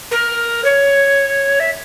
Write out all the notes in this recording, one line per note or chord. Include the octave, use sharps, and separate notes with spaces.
A#4
C#5
E5